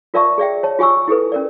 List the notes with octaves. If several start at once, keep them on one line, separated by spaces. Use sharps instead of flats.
F4 A#4 D5 E5 A5 C#6
G#4 D5 E5 G5
C#5 A5
F4 G4 G#5 C#6 E6
E4 G4 A4 B4
C#4 A#4 D5